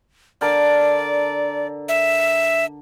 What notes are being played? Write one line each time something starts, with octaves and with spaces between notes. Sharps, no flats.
D3 A#4 D5 A5
E5